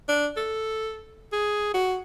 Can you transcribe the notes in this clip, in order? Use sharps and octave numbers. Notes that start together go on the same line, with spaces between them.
D4
A4
G#4
F#4